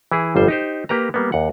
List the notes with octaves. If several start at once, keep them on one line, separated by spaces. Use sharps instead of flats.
E3 E4 G#4
G1 F2 G3 C5
D#4 G4 C5
A#3 G4 B4 A#5
G3 A#3 B3
D#2 F#5